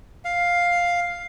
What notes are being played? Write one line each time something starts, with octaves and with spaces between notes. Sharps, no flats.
F5